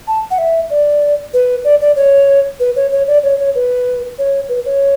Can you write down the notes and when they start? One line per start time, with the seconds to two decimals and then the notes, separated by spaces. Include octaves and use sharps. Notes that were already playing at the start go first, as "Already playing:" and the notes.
0.08 A5
0.31 F#5
0.38 E5
0.70 D5
1.34 B4
1.64 D5
1.81 D5
1.96 C#5
2.60 B4
2.76 C#5
2.92 C#5
3.07 D5
3.23 C#5
3.39 C#5
3.55 B4
4.18 C#5
4.49 B4
4.66 C#5